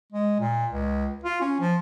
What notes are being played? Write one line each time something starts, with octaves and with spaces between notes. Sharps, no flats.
G#3
A#2
C#2
F4
C#4
F3